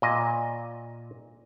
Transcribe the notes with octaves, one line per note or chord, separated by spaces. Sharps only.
A#2 D#5